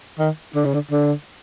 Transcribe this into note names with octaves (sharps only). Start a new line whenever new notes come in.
D#3
D3
C#3
D3
D3